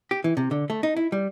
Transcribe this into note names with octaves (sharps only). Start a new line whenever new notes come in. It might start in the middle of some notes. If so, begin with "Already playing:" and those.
G4
E3
C3
D3
A3
D#4
E4
G3